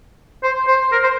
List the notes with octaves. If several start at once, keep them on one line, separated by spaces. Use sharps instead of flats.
C5
C5
A#4
C5